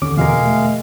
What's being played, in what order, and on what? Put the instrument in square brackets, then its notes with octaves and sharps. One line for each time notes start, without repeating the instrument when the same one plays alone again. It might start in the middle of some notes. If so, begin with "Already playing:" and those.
[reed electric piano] D#2 C#4 D6 [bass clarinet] D3
[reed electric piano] E2 B2 A#4 [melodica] G#3 F5
[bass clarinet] A3